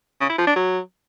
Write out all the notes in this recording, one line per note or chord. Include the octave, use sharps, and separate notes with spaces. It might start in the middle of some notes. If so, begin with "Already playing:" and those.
C#3
E4
F3
D4
F#3